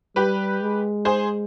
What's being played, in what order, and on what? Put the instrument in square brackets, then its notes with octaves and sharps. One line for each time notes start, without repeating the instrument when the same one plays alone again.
[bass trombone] G3 [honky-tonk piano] G4 B4
[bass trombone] G#3
[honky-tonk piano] G#4 C5